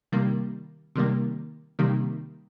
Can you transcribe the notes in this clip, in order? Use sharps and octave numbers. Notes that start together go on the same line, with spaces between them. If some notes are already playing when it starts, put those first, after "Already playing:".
C3 D#3 G3 A#3
C3 D#3 G3 A#3
C3 D#3 G3 A#3